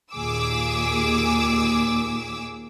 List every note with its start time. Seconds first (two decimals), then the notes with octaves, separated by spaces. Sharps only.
0.13 D#2 A#2 G#4 D6 E6